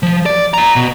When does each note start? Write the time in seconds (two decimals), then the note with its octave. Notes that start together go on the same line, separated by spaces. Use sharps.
0.03 F3
0.26 D5
0.54 D5 A#5
0.76 B2